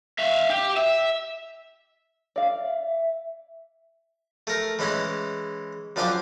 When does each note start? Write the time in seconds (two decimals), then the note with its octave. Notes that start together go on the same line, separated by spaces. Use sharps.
0.18 E5 F5
0.50 G4
0.76 E5
2.36 D5 F5
2.61 E5
4.47 A3 A#4
4.79 E3 G#3 C#4 E4
5.96 F#2 F3 D4 F5 G5 D6